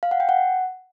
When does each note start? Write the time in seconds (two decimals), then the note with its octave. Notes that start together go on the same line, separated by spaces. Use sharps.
0.03 F5
0.11 F#5
0.20 G5
0.29 F#5